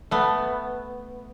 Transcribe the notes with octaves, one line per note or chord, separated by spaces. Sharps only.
A3 B3